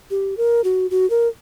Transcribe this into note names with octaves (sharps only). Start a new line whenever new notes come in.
G4
A#4
F#4
F#4
A#4